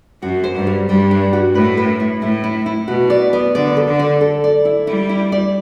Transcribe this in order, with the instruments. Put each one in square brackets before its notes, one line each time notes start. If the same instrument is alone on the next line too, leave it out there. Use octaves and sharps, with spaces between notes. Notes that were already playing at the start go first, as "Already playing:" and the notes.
[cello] F#2 [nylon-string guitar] F#4
[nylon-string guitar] C5
[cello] G2
[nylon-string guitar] G3
[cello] G2 [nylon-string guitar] G3
[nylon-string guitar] D4
F#4
[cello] A2 [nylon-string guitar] B4
[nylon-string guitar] B4
E4
[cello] A2 [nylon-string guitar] E4
[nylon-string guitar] E4
E4
[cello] B2 [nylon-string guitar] F#4
[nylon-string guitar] D5
B3
[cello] D3 [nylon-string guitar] D5
[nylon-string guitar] A4
[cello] D3
[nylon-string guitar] D5
A4
D5
E4
[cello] G3 [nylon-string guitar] E4
[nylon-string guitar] E4
D5